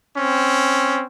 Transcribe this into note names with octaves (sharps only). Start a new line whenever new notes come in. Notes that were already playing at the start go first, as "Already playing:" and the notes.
C4 C#4